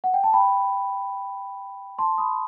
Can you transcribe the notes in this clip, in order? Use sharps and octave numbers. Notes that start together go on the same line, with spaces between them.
F#5
G5
A5
G5 B5
A5 C6
B5 D#6